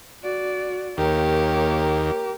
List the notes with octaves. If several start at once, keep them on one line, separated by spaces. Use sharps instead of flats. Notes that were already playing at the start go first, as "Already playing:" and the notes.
F#4 D5
D#2 A#3 G4 A#4 C#5